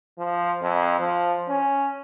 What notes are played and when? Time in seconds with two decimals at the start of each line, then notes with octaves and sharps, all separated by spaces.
0.18 F3
0.62 F2
1.00 F3
1.48 C#4